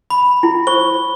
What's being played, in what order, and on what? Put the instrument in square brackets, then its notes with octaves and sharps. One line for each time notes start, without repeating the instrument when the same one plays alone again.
[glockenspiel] B5
[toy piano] E4
[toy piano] C5 C#6 [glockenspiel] G7